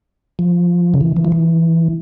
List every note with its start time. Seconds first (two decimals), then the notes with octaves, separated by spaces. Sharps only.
0.39 F3
0.94 C#3
1.01 E3
1.16 E3
1.25 F3
1.32 E3